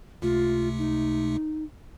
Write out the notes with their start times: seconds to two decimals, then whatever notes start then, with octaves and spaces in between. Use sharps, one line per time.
0.22 C#2 C3 A3 F4
0.78 D#4